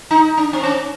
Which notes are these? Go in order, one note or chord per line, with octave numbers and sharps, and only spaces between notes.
D#4
D4
C4
C#4